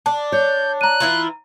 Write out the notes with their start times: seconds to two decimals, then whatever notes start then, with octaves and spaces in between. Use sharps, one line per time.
0.06 D4 A5
0.32 C#5 G6
0.81 A#5 F#6 D#7
1.00 E3 E4 F4